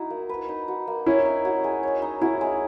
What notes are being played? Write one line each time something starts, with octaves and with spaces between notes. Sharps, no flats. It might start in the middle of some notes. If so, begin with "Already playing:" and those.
Already playing: D#4 E4 F#4
A#3
B4
D#4
F#4
A#3
C#4 E4 C#5
D#4
F#4
G#3
C#5
D#4
C#4 E4 F#4
G#3